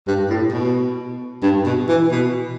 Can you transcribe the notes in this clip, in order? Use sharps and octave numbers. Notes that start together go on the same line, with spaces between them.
G2
A2
B2
G2
B2
E3
B2